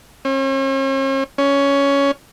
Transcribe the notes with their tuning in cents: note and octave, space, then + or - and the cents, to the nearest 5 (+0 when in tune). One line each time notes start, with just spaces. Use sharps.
C#4 -45
C#4 +10